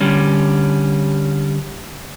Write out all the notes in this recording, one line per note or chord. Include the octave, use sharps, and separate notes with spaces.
D3 G3 C#4